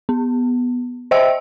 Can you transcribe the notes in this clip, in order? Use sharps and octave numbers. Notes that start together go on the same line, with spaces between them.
B3
C5 D#5 E5 G5 E6